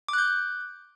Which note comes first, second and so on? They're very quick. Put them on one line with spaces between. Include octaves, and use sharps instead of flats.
D6 F#6 G6